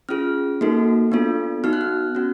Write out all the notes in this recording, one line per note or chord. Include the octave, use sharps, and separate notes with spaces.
C#4 F4 G#4 F6
A#3 D#4 F#4 A4
B3 D4 F4 A4
B3 D#4 F#4 F6
F#6
F6
C#4 F#4